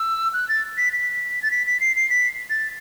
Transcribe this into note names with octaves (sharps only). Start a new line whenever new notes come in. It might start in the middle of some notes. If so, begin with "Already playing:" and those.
Already playing: E6
F#6
A6
B6
B6
A6
B6
B6
C7
C7
B6
A6